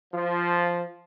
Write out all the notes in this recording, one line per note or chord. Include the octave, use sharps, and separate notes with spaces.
F3